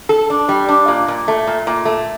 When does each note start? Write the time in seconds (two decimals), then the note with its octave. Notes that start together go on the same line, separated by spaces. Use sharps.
0.09 A4
0.30 D4
0.49 G3
0.69 D4
0.88 A#2
1.08 A#2
1.28 A3
1.47 A#2
1.67 A#2
1.85 A3